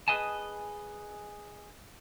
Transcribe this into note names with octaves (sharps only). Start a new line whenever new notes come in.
G#4 A#4 B4 D#5 G#5 A5